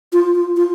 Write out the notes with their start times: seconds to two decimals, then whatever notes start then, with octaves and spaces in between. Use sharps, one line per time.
0.13 F4
0.35 F4
0.57 F4